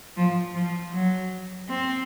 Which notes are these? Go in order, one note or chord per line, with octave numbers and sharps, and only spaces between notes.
F3
F3
F#3
C4